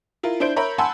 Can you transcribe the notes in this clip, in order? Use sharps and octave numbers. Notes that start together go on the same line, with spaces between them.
E4 F4 A#4
D4 E4 C5 G6 D7
A#4 C#5 E5 A#5 B5
F#5 G#5 A5 B5 C6 E6